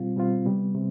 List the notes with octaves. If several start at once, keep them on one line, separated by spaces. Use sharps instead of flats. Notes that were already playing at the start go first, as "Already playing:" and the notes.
Already playing: B2 G3 C4 F4
B2 G3 C4 F4
C3 G3 B3
C3